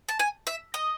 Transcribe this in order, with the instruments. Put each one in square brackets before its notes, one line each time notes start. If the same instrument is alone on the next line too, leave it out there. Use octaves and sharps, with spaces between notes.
[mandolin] A5
G#5
E5
D#5